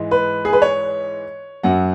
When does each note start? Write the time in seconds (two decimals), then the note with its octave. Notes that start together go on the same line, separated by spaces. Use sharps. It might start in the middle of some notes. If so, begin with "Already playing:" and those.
Already playing: G#2 E3 G#3
0.11 B4
0.45 G#4
0.53 B4
0.62 C#5
1.63 F#2 F#3 F#5